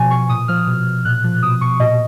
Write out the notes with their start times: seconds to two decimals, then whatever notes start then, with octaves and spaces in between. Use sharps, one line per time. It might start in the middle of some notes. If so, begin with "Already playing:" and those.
Already playing: B2 F3 G#5
0.11 B2 C#6
0.29 A#2 D#6
0.48 F3 F6
0.67 B2
0.87 B2
1.05 A#2 F#6
1.24 F3
1.42 B2 D#6
1.61 B2 C#6
1.80 A#2 D#5